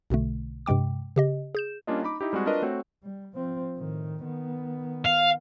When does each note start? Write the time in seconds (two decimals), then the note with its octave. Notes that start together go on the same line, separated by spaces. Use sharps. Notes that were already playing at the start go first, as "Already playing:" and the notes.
0.10 B1 B2 D3 A3
0.66 G2 C3 G#3 G5 D6
1.16 C#3 G4 D#5
1.55 G#4 G6 E7
1.87 G3 A#3 C#4 D4 F4 D#5
2.02 D#4 D#5 B5 D6
2.21 D#4 E4 G4
2.33 G3 G#3 C4 F#4 G#4
2.46 D4 F4 F#4 A#4 B4 D#5
2.62 A3 C4 F#4 C#5
3.03 G3
3.35 F3 C4
3.78 A2 D#3
4.25 D#3 B3
5.05 F5